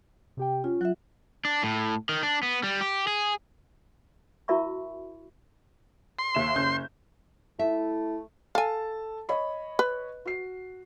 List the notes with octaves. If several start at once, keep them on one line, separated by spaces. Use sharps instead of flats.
C3 G4 G5
C#4 F4
F#3 F4 E5 F#6
D4
A2
D#3
D4
B3
G3
G4
G#4
E4 F#4 A#4 E5 B5 C#6
C6
D#2 E5 E7
F#1 C#4 G6
A3 E4 E5
A4 F5 G#5 A5
C#5 D#5 B5
B4
F#4 C7